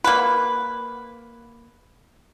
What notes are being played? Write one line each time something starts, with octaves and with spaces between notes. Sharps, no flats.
A#3 B4